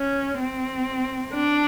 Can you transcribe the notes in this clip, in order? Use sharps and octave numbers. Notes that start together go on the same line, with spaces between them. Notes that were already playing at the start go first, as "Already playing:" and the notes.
Already playing: C#4
C4
D4